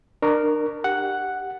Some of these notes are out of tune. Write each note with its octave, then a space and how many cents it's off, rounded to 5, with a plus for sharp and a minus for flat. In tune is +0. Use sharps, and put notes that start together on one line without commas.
D4 +35 A#4 +0 C#6 +20
G4 +5 F#5 +0